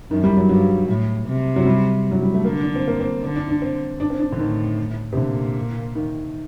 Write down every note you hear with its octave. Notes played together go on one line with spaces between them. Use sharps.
F#2 D#3
G3
F#3
G2 F#3
A2
C3
F#3
G3
F#3
G3
A3
D3 A#3
D4
C4
A#3
C4
D3 D4
D4
D4
C4
D4
C4
D4
D3
A2 D#3
C3
A#2 D3
D#3